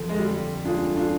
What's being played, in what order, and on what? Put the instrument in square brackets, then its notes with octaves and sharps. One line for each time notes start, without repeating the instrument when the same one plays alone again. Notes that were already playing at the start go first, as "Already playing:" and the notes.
Already playing: [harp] F2 D3 F3 C4
[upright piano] G#3
G3
[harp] D2 D3 G#3 [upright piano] D4 F4
[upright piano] D4 F4